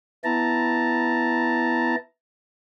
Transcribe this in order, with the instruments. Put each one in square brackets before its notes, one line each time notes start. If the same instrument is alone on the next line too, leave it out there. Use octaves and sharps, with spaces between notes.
[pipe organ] B3 E4 A5 A#5